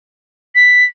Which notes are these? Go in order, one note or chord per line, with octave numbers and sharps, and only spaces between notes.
B6